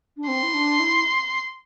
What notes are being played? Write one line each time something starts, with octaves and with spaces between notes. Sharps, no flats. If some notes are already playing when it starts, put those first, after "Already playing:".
D4
C4 C6
E4
D4
E4